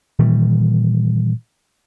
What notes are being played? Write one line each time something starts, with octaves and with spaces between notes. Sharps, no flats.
A#2 D#3 E3 G3